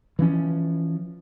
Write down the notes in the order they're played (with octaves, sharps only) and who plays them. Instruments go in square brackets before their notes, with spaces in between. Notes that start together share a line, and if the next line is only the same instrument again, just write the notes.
[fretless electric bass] E3 F3 C#4